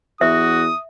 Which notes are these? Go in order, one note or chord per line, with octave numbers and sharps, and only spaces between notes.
E2 F#4 E5 D#6